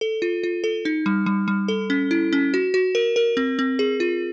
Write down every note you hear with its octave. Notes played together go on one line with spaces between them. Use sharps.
A4
F4
F4
A4
D#4
G3
G3
G3
A4
C#4
E4
C#4
F#4
F#4
A#4
A#4
C4
C4
G#4
F4